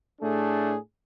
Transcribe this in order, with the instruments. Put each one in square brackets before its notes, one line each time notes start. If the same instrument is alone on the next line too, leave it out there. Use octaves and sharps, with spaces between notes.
[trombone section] A2 A3 D4 G#4